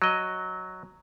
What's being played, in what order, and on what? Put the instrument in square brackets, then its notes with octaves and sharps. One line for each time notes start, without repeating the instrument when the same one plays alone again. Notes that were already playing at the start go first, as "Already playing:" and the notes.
[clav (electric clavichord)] F#3 D#5